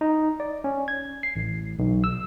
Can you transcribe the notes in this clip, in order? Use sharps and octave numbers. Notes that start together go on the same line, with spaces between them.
D#4
D5
C#4
G#6
C7
A1
B1
E6